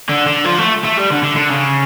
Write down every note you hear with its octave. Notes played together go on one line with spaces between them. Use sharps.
D3
D3
F3
A3
A3
G3
D3
D3
D3
C#3